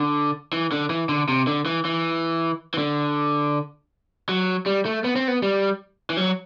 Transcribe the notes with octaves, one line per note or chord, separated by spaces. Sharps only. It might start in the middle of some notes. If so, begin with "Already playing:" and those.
Already playing: D3
E3
D3
E3
D3
C3
D3
E3
E3
E3
D3
F#3
G3
A3
B3
C4
B3
G3
E3
F#3